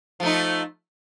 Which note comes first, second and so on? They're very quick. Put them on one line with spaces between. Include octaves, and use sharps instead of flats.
F3 A3 D#4